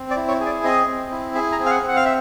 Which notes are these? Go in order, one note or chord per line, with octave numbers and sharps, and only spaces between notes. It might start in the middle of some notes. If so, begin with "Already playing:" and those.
Already playing: C4
D5
E4
C#5
G#4
D5
C4 D#5
C4
E4
G#4 E5
A#5
C4
F5
F#5
C4
F#5
F5
E5